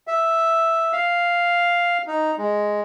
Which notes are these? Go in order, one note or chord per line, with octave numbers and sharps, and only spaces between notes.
E5
F5
D#4
G#3